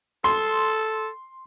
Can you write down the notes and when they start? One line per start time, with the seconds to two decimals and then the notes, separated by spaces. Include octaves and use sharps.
0.24 A4 C6